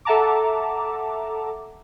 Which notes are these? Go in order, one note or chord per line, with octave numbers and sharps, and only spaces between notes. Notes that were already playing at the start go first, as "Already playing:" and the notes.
A4 E5 F#5 A5 A#5 D6